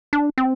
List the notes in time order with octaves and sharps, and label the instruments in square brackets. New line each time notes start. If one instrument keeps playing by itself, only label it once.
[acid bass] D4
C4